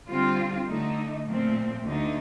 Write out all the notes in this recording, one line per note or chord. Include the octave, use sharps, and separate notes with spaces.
D3 G3 C4 F4
D3 A3 D#4
A#2 F3 A3 C4
D2 D3 A3 D#4